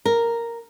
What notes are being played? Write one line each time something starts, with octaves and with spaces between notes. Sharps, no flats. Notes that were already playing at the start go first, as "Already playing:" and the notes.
A#4